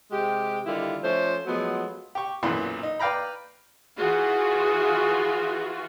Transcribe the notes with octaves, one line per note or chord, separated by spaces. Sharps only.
C3 G#3 G4
D3 D#3 G3 E4 F4
F3 A3 C#4 C5
F3 F#3 G#3 A3 B3
G4 C#6
B1 F#2 A#2 E3 C6
D#4
B4 D5 F5 G5 A#5 B5
E3 F4 F#4 G#4